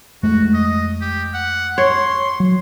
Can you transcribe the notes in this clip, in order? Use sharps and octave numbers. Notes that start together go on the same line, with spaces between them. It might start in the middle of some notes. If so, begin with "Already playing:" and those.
F2 G#3 A3 F#4
D#5
G4
F#5
C#5 C6
F#3